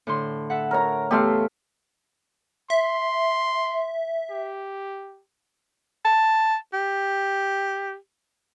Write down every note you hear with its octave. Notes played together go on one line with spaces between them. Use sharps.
A2 D3 C6
A4 E5 F#5
A#4 C#5 A#5
E2 A3 G4 A4 F5 C6
E5 C6
G4
A5
G4